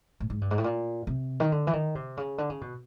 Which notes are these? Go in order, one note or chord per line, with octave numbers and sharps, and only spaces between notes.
A2
G#2
G2
G#2
A2
A#2
C3
D#3
D3
E3
D#3
C3
C#3
D3
C#3
B2